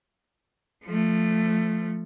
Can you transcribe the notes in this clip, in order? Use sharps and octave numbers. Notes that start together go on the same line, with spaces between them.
F3 A3